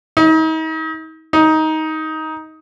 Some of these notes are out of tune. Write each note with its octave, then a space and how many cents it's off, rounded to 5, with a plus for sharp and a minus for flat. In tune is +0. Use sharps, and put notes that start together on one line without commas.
D#4 +40
D#4 +15